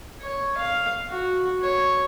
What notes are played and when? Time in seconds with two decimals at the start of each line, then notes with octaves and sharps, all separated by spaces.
0.22 C#5
0.57 F5
1.09 F#4
1.63 C#5